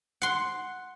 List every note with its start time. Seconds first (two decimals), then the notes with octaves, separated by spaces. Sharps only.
0.22 F#5 C6